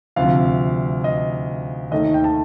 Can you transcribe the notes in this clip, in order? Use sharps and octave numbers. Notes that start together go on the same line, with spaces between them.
D2 C3 F3 F5
D#5
D#2 D#3 A3 D#5
G5
A5